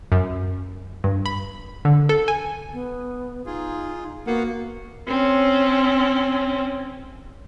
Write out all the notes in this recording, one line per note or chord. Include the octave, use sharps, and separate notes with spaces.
F#2
G2
B5
D3
A4
G#5
B3
D#4 F4 G#4
A#3 B3 F#4 F5 F#5
C4 C#4